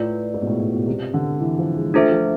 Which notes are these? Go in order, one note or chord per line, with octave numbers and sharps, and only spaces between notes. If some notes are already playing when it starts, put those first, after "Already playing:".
Already playing: A2 F4 B4 D5
G#2
B2
A2
A2
B2
C3
D3
E3
F3
G#3
A3 D4 F4 A4 C5 E5
F3